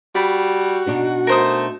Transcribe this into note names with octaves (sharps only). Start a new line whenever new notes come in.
G3 F#4 B5
B2 D4 D#4
A3 A#4 C5 D#6